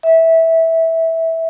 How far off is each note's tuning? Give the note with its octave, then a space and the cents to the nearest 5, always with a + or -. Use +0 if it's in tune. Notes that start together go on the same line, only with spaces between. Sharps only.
E5 -15